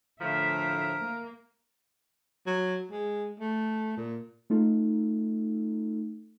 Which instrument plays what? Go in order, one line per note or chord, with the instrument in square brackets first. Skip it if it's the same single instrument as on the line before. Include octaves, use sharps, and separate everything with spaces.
[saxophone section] A2 F3 [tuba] D3 [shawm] A#4 [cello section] E5
[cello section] A#3
[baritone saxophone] F#3
G#3
A3
A#2
[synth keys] A3 D#4 F4 A4